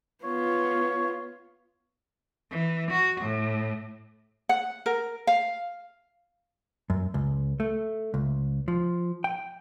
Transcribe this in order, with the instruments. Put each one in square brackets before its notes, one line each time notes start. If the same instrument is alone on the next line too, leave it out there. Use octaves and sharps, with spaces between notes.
[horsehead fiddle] B3 F4 [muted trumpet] C#5
[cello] E3
F#4
A2
[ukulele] F#5
A#4
F5
[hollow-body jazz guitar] F#2
C#2
A3
C#2
F3
G5